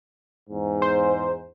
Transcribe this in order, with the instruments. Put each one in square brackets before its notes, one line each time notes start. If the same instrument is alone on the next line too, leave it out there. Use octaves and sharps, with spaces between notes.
[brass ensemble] E2 G#2
[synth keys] C5